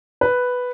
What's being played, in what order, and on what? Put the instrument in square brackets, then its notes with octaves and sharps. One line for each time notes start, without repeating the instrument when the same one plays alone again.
[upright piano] B4